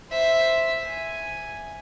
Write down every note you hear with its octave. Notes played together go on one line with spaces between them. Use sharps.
C5 E5
G#5